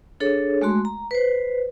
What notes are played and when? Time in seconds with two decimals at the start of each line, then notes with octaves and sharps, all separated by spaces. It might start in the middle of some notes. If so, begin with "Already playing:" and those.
0.20 D4 G#4 A4 C#5
0.62 G#3 A3 F#4 C6
0.85 A#5
1.11 B4 C5